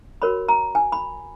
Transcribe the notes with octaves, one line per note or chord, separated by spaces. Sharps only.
F#4 A#4 C#5 B5
A#5
G#5
B5